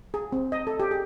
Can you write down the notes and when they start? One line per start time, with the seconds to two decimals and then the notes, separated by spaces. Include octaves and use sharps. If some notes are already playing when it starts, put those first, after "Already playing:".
0.14 G#4
0.32 C4
0.52 D#5
0.67 A4
0.80 G4
0.91 G#4